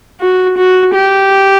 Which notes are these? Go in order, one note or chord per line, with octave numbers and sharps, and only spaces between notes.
F#4
F#4
G4